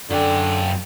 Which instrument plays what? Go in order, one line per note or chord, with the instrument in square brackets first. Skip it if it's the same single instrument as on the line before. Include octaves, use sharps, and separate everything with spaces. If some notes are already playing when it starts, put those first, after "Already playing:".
[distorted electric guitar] F#2 G5 [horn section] D3